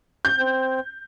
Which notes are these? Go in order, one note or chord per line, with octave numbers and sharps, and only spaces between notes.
G6
C4